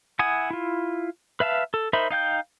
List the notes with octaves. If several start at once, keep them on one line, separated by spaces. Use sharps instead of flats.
E4 F#5 G#5 D#6
E4 F4
B4 E5 F5 A5
A4
D#4 A#4 C5 E5 B5
D#4 F5 G5 G6